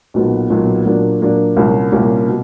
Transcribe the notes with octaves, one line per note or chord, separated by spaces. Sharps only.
B1 A#2 F#3 B3
B1 A#2 F#3 B3
A#2 F#3 A#3 D4
A#2 F#3 A#3 D4
C2 A#2 G3 A#3 C#4
C2 A#2 G3 A#3 C#4
B2